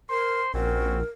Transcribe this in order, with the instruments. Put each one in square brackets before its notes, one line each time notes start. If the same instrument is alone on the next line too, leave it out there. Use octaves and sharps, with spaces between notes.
[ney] A#4 [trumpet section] C5 C6
[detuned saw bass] A#1 [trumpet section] C4 C#4 F#4 [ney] A#4